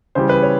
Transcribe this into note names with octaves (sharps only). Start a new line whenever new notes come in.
C#3 E3 G3 C5
B4
C#5